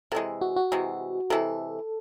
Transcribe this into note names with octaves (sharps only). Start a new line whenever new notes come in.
C3 E3 G#3 A4
F#4
F#4
C3 E3 G#3
C3 E3 G#3 A4